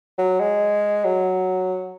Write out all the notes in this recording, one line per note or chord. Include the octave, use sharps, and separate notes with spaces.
F#3
G#3
F#3